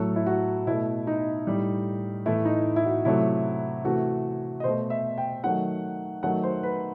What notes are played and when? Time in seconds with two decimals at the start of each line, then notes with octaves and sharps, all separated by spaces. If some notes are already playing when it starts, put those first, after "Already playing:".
Already playing: A2 F#3 A3 A4
0.16 E4
0.27 F#4
0.67 B2 A3 E4
1.07 D#4
1.47 A2 G3
2.26 A2 E3 A3 E4
2.45 D#4
2.76 E4
2.86 F#4
3.05 C3 F#3 A3 E4
3.85 C3 E3 A3 F#4
4.60 D#5
4.64 B2 A3 C5
4.90 E5
5.18 G5
5.44 D#3 F#3 A3 F#5
6.23 D#3 F#3 A3 F#5
6.43 C5
6.63 B4